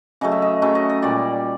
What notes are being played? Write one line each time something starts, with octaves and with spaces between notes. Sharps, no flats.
C#3 F#3 A3 D#5
E5
D#5
C#3 F#3 A3 E5
D#5
D#5
A#2 G3 D5